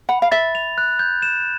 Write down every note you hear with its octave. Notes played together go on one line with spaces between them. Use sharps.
F#5 B5
F5
E5 A6
F7
F#6
G6
E7